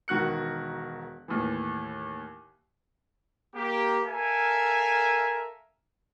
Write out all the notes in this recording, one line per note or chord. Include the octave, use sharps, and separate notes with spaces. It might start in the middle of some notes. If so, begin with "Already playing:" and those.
E1 D#3 F#4 F#6 C#7
D#2 A2 E3
A#3 G4
A4 A#4 E5 F5 G#5